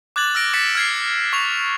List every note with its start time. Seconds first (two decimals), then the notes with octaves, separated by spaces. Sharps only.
0.16 D6 F#6 G#6 A6 F#7
0.35 E6 F6 A#6 D7
0.53 D6 A6 B6 C#7 E7
0.75 F6 G#6 C7
1.33 C#6 F7